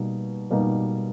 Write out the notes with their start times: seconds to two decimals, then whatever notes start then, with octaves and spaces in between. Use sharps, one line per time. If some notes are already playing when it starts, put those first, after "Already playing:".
Already playing: B2 G3 A#3 D#4
0.51 B2 G3 A#3 D#4